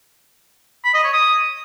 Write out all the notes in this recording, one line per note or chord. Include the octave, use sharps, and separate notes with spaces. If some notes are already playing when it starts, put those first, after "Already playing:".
B5
D#5
C#5
D#6